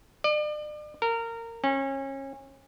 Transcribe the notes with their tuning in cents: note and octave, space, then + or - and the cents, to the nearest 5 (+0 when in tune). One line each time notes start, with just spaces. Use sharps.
D5 +40
A#4 -20
C#4 -30